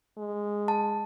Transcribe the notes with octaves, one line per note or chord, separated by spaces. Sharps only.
G#3
A5